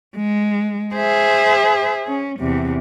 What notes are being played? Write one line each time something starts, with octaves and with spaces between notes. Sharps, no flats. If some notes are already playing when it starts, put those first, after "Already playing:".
G#3
G#4 C5 E5
C#4
E2 C3